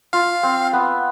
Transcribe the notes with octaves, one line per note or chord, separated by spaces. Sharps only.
F4 F5
C4
B3